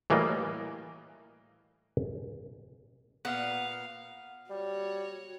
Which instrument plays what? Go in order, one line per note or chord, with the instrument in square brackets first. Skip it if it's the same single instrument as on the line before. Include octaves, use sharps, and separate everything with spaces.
[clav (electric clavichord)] A2 E3 G3 A#3 D5 D#5
[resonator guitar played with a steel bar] A#2 B3 [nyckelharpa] F5 [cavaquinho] F#5
[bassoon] G3 [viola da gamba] F#4 C#5